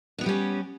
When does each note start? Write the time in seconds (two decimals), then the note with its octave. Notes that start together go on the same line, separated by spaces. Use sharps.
0.18 D4
0.21 B3
0.24 G4
0.26 G3
0.29 C#4